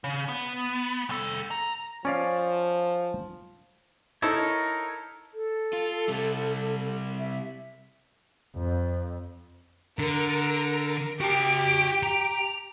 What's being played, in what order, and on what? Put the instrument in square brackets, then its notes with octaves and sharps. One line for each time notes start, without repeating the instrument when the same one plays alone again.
[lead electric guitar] C#3
B3
C2 A4
A#5
[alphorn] F3 [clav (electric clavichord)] C#4 D5 F5
[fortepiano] D#4 E4 A4 [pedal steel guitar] A#4 C#5
[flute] A4
[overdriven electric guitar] F4
C3 G3
[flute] E5
[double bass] F2
[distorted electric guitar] D3 [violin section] A#4
[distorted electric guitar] F#4 A5 [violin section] G4 D7
[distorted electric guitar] A#5